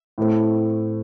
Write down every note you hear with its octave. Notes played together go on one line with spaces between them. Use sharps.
A2 A3 C4